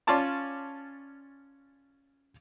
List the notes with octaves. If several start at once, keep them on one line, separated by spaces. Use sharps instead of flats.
C#4 F4 D5 A5 C6